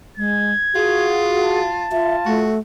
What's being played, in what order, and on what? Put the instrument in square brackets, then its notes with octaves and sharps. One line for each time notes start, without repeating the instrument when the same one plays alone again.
[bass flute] G#3 [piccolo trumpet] G#6
[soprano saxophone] F4 [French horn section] F#4 [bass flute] G#4
[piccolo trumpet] A5
[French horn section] F4 [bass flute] E5
[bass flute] A3 [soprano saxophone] F#4